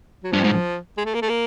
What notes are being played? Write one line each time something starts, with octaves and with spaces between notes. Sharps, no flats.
F#3
G2 F3
G#2
G#3
A3
A#3
A3
A#3